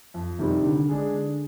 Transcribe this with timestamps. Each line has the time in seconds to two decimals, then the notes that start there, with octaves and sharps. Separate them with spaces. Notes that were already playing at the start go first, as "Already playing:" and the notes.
0.14 F2
0.39 C3 D#3 G3 C4
0.64 D3
0.89 G#3 D4 G#4
1.14 D3